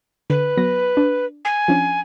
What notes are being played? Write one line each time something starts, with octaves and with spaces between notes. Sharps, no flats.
D3 B4
F#3 B3 A#6
D4
G#5
F3 C#4 D4